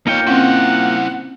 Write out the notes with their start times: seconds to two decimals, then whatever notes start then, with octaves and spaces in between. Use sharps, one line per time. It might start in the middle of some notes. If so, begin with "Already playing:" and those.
0.07 A#3 D#4 F4 C#5 G5 C#7
0.27 C4 C#4 E4 C5 F#5